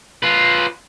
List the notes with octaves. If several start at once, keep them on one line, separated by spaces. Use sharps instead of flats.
F4 B4